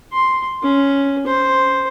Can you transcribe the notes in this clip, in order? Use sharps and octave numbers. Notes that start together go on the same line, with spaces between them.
C6
C#4
C5